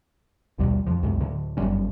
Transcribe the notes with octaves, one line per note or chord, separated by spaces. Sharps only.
A#1 D#2 B2 G3
F2 F3
C2 F#2 A2 G#3
D2 A2 D3
G1 F#2 G3 C#4